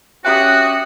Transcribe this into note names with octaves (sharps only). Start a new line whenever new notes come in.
C#4 F#4 G4 E5 G5 D#6 F#6